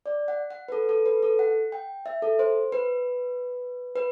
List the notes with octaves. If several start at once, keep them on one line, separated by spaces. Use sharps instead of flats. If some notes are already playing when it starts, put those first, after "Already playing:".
D5
F#5
F#5
B4
A4
A4
B4
A4
F#5
G5
E5
A4
C5
B4
B4